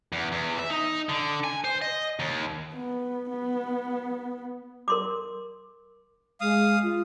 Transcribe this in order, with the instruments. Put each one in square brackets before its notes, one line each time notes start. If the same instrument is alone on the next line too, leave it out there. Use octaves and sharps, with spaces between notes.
[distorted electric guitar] E2
E2
E5
D#4
D3
G#5
C5
D#5
D#2
[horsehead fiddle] B3
B3
[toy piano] A#4 C6 D6
[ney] G#3 [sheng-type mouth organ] F5 D#6
[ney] F4